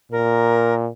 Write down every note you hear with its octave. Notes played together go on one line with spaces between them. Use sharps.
A#2 A#4